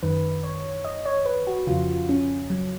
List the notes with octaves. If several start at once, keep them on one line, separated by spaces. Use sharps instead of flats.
F#2 D#3 B4
C#5
D#5
C#5
B4
F#4
F2 C#3 F4
C#4
F#3